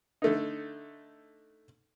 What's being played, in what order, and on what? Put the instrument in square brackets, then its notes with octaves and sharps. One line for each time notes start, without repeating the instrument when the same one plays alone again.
[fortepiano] D3 A3 D#4